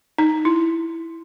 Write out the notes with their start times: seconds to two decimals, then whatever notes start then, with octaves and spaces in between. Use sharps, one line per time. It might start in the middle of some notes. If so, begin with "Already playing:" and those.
0.18 D#4
0.45 E4